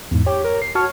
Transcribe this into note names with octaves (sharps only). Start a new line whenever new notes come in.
E2 G#2
G4 C#5
A#4
C7
F#4 C#5 A5 F6